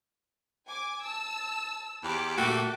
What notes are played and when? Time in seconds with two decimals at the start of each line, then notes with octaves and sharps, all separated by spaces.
0.67 G#5 D6
1.03 A5 E6
2.04 E2 G4 D6
2.38 A#2 A3 F#4 A4